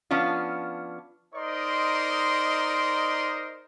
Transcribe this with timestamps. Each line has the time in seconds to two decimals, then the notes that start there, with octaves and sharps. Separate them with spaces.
0.11 F3 B3 C#4 D4 F4
1.35 D#4 A#4 C5 D5 D#5 C6